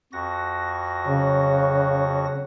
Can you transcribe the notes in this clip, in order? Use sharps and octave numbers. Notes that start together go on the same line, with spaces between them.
F2 F#4 A#6
C#3 F#3